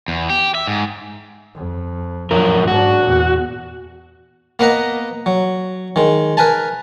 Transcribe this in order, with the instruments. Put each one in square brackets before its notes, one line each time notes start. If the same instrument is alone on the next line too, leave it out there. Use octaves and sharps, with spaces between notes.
[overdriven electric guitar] E2
G4
E5
G#2
[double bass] F2
[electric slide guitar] F#2 F3 A#4 [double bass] F#3
[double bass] G#2 D4 [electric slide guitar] F#4
[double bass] E2 A#2
[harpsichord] A#3 B3 B4 D#5 A#5
F#3
D#3 G#3
A#4 B4 G#5 A5